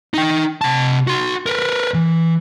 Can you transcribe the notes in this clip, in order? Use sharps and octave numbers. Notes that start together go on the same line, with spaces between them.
D#4 G5
C3 A5
F#4 C6
A#4 B4
E3